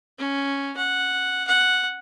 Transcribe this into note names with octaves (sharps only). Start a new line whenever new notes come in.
C#4
F#5
F#5